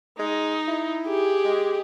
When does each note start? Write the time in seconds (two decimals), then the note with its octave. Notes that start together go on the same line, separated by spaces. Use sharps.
0.19 G#3 D#4
0.68 E4
1.08 G4 G#4
1.44 G#3